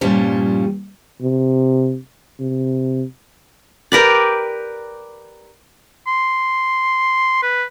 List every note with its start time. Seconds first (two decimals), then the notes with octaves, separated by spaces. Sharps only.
0.01 G2 A#2 F3 G3 C#4
1.22 C3
2.40 C3
3.92 G4 A#4 B4 D5
6.07 C6
7.43 B4